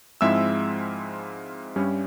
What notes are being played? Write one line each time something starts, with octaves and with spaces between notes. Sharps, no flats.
G#2 F3 G#3 C4 E4 E5 E6
G2 G3 C#4